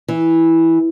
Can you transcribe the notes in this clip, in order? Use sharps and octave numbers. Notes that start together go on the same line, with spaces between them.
E3